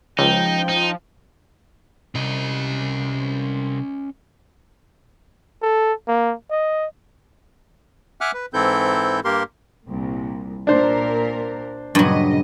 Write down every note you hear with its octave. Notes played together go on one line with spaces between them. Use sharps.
C#2 F3 D#4 G5
D#4
C2 C#4 D#5
A4
A#3
D#5
E5 F#5 G#5 D6 F6 F#6
B4
G#2 E3 C4 E4 A4 G6
G2 A#3 G4 A#4 C6
C2 A#2
A#2 D4 A#4 C5
G2 A#2 C#3 F#3 D#5